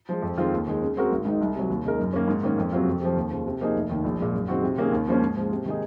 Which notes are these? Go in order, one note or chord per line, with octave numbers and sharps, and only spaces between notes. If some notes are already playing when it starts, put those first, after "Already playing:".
F3 G#3
F2
D#3 G#3 C4 F4
D#2
D#3 G#3
C#3
G#3 C4 F#4 A#4
G#1
G#2 D#3 G#3 D#4
C2
C3 F#3
D#2
C#3 G#3 D#4 A#4
F#2
D#3 A#3 C#4
G#2
D#3 A#3 C#4
F2
C3 F#3 C4 F4
F2
C3 F3
D#2
C#3 F3
C3
F3 A#3 D#4 G#4
F1
D#2 D#3
A#1
A#2 G#3
F#2
D#3 G#3 C4 F#4
C3
D#3 A#3 C#4 G#4
D#2
C#3 F3 A#3 C#4
G#2
F3 G#3
C3
D#3 G#3 D#4 G#4